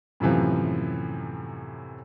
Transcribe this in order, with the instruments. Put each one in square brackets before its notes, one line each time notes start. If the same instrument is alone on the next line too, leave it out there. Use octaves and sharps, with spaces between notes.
[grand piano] F#2 A2 C3 E3 F3